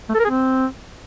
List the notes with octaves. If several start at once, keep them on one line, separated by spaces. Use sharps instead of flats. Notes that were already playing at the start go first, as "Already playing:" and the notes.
A3
A4
A#4
G#4
C4